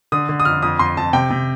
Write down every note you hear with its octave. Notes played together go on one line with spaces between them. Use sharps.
D3 D#6
D3
D#6
F2 F6
F2 D#6
F2 C6
F2 A5
C3 G5
C3